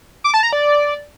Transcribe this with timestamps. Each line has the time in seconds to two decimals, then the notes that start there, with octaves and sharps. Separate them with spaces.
0.24 D6
0.34 A5
0.43 A#5
0.53 D5